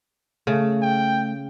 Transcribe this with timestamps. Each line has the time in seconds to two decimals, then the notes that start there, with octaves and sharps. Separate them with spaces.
0.47 C#3 A3
0.82 G5